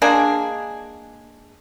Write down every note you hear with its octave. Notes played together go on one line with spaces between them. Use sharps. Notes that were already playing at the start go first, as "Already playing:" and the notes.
G#3 A#3 D4 G#4